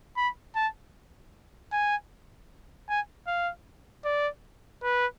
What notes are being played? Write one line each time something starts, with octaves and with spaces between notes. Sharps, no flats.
B5
A5
G#5
G#5
F5
D5
B4